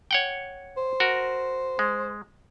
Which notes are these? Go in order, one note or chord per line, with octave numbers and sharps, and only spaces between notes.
C#5 F#5 G5
C5
F#4 A#4
G#3